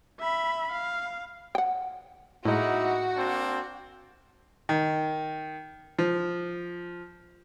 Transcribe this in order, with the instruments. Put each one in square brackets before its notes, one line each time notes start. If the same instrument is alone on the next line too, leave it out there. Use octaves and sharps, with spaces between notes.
[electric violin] E5 B5
F5
[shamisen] F#5 G5
[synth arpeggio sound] A2 G#3 [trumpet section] A#3 D#4 E4 [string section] F#4
[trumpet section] A#3 C4 D4
[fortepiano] D#3
F3